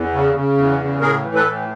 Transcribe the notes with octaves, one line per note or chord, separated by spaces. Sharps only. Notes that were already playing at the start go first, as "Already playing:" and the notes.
Already playing: E2
C#3
C#3
E2
C#3
A2 G#4 A#4
E3
A4 B4
A2